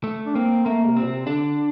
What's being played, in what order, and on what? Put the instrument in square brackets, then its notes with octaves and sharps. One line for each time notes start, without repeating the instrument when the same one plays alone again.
[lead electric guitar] A3
[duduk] D4
[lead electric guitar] A#3 [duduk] C4
[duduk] A3 [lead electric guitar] A#3
[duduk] C3
[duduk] A#2 [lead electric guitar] C4
[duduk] C3
[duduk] D3 [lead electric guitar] D4